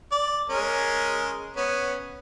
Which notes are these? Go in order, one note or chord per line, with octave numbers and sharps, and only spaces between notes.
D5
G#3 C#4 A#4
B3 C#4